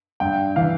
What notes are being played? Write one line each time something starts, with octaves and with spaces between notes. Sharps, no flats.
G2 G5
E3 F5